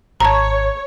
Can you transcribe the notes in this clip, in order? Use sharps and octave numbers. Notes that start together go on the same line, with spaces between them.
G#1 C#5 A5 A#5